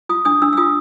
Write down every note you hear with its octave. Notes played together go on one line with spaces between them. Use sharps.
F4 D#6
D4 D#6
D4 E6
E6
F4 D#6